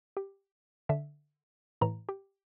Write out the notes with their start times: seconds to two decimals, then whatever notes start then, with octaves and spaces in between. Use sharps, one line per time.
0.17 G4
0.89 D3 E5
1.81 A2 E3 A#5
2.09 G4